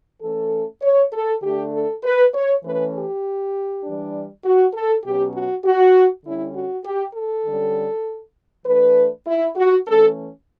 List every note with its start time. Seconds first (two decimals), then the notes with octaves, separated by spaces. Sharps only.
0.22 E3 A3 C#4 A4
0.82 C#5
1.13 A4
1.43 D3 A3 D4 G4
1.72 A4
2.03 B4
2.33 C#5
2.63 E3 A3 C#4 B4
2.94 G4
3.84 E3 G3 D4
4.44 F#4
4.74 A4
5.04 B2 F#3 C#4 G4
5.34 F#4
5.65 F#4
6.24 D3 G3 C#4 E4
6.55 F#4
6.85 G4
7.15 A4
7.45 D3 G3 C#4
8.65 E3 A3 D4 B4
9.27 E4
9.56 F#4
9.87 E3 A3 C#4 A4